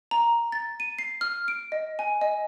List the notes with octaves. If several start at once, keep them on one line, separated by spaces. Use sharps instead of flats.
A#5
A6
D#7
C7
F6
D7
D#5
G#5
D#5